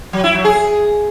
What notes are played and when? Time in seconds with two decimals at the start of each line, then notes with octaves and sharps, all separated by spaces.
0.13 F#3
0.24 E4
0.34 F#3
0.45 G#4